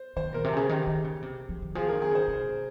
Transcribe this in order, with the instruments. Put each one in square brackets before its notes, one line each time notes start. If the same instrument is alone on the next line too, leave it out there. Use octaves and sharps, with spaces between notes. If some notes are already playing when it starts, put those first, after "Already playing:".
Already playing: [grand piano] C5
[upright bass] D#3 [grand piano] C5
[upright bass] A#2 [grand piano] A#4
[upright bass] C3
[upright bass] C#3 [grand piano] G#4
[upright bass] D#3 [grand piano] G4
[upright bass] D#3
C#3
C3
F3
D#3
[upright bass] F3 [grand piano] G#4
[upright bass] D#3 [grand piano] A#4
[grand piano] G#4
[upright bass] C#3 [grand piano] C5
[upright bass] C3